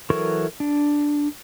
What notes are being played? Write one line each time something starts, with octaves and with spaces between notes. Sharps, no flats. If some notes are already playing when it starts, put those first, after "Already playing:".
E3 F#3 A4 A#4 C#6
D4